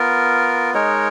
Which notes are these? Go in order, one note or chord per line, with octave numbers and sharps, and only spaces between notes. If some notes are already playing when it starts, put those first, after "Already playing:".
Already playing: B3 F4 A#4
G#3 D#4 A#4 C#5